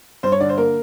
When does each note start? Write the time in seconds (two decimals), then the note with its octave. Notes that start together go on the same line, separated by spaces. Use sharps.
0.23 G2 C5
0.32 C#5
0.40 D3 D5
0.49 C5
0.58 A#3 A#4